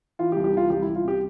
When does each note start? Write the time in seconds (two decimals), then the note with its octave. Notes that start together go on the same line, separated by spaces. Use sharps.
0.19 E3 F4
0.32 G4
0.36 C2
0.44 G4
0.53 E3 F4
0.70 C2 G4
0.82 E4
0.87 C2
0.95 F4
1.04 C3 G4